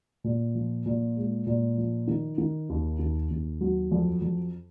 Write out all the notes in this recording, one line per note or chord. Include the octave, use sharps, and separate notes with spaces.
A#2
F3
A#2
G#3
A#2
F3
D#3
D#3
D#2
D#2
D#2
F#3
F2
F2